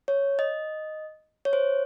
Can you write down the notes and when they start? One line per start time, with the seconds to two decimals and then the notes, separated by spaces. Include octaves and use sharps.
0.08 C#5
0.39 D#5
1.45 C#5
1.53 C5